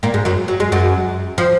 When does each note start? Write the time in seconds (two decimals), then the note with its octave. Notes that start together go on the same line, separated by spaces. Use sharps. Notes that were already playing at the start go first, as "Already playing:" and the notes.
0.03 A#2 A#3
0.14 G#2 G#3
0.25 F#2 F#3
0.48 F#3
0.60 G#3
0.72 F#2 F#3
1.38 F3